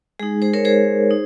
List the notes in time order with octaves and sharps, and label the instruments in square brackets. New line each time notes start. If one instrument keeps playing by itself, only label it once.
[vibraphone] G#3 D#4 G#4
G#4 C5
A#4 C#5
G#4 C5
D#4